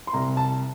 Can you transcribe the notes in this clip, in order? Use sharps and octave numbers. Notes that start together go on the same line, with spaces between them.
C6
C2 A#5
A5